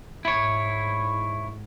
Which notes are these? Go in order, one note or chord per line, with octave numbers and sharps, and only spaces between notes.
G#2 E4 C#5